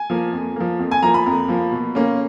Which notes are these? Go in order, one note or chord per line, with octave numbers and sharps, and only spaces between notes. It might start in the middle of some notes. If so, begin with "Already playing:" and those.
Already playing: G#5
F3 A#3
F2
F3 A#3
F2
G#5
F3 A#3 A#5
B5
F2
F3 A#3
B2
A#3 C#4